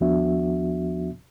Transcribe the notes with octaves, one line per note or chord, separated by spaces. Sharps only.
D#2 F3 B3 D4 F#4 E5